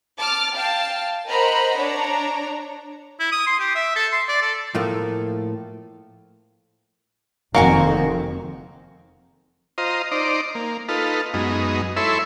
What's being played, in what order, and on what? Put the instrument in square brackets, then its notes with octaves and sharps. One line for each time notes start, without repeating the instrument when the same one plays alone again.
[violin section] A5 D6 F6
F5 G5 A5
A#4 C5 D#5 F#5 A#5 B5
D4 C#5 A#5
[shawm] E4
D#6
C6
G4
E5
A4
C6
D5
A4
[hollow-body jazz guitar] A2 F3 A3 A#3
[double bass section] F1 F2 D#3 [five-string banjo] A#3 F#4 G#5
[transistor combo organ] F4 C5 D#5 A#5
D#4 C5 D5
A#3
D#4 F4 A4 B4
F#2 G#3 B3 D#4
E4 A4 C#5 E5 B5 C6